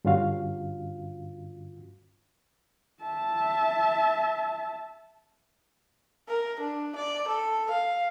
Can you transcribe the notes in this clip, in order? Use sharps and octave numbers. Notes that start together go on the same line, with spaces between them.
G2 D3 C#4 F4 F#4 F5
E5 A5
A#4
D4
D5
A4
F5